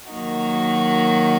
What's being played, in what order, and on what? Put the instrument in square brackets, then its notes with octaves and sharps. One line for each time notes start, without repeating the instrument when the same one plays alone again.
[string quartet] D#3 F#3 A#3 D#4 F#4